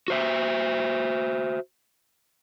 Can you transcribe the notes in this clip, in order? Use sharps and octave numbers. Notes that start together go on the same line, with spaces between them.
F#4 C5 E5